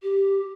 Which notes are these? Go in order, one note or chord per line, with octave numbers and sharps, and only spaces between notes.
G4